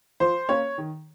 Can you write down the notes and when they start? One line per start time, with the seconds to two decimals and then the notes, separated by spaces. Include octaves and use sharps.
0.20 F3 C5
0.49 A#3 C#4 C#5
0.78 D#3